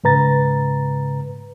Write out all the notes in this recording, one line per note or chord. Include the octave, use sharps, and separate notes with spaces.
G#2 C#3 B4 A#5 A6